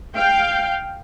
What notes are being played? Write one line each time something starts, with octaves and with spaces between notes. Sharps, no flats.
F5 G5